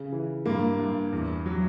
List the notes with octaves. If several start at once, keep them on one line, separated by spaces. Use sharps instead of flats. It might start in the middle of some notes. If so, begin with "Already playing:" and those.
Already playing: C#3
E3
G2 A#3
G2
E2
F#3